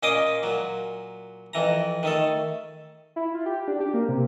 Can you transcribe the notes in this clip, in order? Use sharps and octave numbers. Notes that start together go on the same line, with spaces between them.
A#2 C#4 D#5 C6 D6 D#6
A#2 F#3
F2 E3 A#5
D#3 A3 A4
E4
F4
G4
D4
G4
A#3
C3